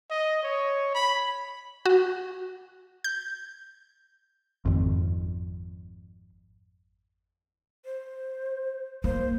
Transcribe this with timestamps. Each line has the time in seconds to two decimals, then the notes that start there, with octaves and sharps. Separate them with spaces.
0.10 D#5
0.43 C#5
0.95 B5
1.86 F#4
3.04 G6
4.65 G#1 F2
7.85 C5
9.04 A#3 C5